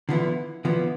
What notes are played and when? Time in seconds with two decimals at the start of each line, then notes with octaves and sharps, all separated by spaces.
0.09 D3 F3 B3 E4
0.65 D3 F3 B3 E4